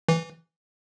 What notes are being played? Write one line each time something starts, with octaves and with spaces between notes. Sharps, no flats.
E3